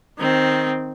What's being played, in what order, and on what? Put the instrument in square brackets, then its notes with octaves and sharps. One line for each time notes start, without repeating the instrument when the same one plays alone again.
[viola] D#3 C4